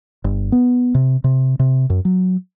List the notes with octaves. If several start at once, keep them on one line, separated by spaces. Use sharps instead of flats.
G1
B3
C3
C3
C3
F#2
F#3